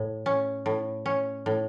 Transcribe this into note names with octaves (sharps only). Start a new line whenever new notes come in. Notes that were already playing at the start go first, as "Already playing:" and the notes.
Already playing: A2
C#4
A2
C#4
A2